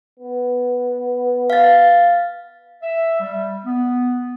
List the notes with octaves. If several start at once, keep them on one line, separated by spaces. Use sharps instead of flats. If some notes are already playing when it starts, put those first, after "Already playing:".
B3
F5 A6
E5
G3
B3